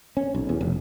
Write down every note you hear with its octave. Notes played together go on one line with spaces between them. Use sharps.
C#4
B1
E2
F1